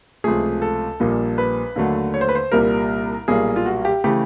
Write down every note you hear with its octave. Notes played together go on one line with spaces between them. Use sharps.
C#2 C3 F3 A3 G#4
A4
A#1 A#2 G3 A#3
B4
D#2 D3 F#3 A3
C#5
C5
B4
C5
C2 A#2 G3 A#3 A#4
B1 A#2 G3 A#3 G#4
F4
F#4
G4
C#3 E3 A3 G4